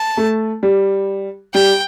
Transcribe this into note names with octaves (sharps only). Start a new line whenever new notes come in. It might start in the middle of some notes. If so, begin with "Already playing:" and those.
Already playing: A5
A3
G3
G3 G5